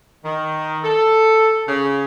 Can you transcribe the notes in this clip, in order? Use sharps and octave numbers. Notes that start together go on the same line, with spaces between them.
D#3
A4
C#3